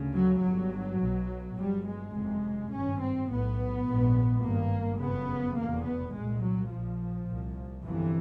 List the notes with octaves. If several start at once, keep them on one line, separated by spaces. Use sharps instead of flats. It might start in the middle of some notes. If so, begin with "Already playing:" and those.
Already playing: D2 C#3
F#3
G1 G2 F#3
B1 B2
G1 G2 G3
G#3
F#1 F2 C3
G#1 G2 C#4
C4
B1 A2 B3
A#1 G#2
G#1 G2 A#3
F#1 F2 C#3 B3
F1 E2 B2 A#3
B3
C2 A#2 G#3
F#3
A#1 A#2 F3
C2 A#2
G1 F2 C3 E3